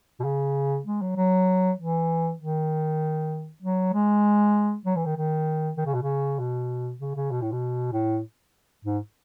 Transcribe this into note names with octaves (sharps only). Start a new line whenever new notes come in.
B2
C#3
G#3
F#3
F#3
E3
D#3
F#3
G#3
F#3
E3
D#3
D#3
D#3
C#3
B2
C#3
B2
C#3
C#3
B2
A2
B2
A2
G#2